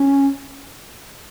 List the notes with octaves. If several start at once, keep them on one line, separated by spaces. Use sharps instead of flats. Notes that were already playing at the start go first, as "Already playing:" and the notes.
Already playing: C#4